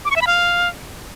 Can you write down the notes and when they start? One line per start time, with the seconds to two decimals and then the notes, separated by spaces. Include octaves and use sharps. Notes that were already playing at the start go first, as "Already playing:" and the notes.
0.05 D6
0.11 C#6
0.16 E5
0.21 B5
0.27 F5